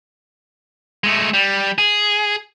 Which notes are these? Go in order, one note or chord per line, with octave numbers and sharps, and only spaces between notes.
G#3 A3
G3
G#4